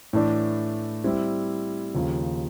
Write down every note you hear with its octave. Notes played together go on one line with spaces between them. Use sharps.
A2 E3 A3 D4
G3 C4 E4
D#2 C#3 F3